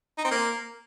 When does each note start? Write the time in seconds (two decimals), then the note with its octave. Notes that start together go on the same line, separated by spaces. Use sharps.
0.18 D#4
0.24 C4
0.31 A#3